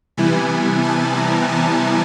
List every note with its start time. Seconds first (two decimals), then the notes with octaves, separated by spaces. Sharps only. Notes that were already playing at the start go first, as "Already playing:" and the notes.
0.17 C3 E3 G3 B3 E4 G#5
0.83 A5
1.16 A#5
1.49 A5